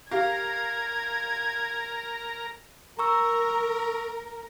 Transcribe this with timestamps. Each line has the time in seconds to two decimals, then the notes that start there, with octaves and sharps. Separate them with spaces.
0.11 G4 A#4 F5 A#5 G#6
2.99 A#4 A#5 C#6 E6